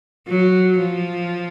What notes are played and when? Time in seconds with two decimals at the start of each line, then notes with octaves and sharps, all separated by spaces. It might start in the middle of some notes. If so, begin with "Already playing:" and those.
0.28 F#3
0.79 F3